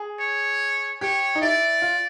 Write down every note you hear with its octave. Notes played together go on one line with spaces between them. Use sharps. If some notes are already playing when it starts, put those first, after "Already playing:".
Already playing: G#4
C#5
G4 C#5
D#4
E4 D5
F4